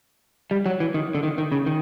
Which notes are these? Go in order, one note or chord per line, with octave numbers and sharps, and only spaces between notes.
G3
F#3
E3
D#3
D3
D#3
D#3
C#3
D#3